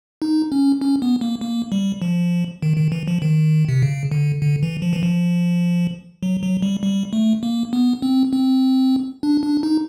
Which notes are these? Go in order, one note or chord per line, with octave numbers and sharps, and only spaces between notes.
D#4
C#4
C#4
B3
A#3
A#3
G3
F3
D#3
D#3
E3
F3
D#3
C3
C#3
D3
D3
E3
F3
E3
F3
F#3
F#3
G3
G3
A3
A#3
B3
C4
C4
D4
D4
D#4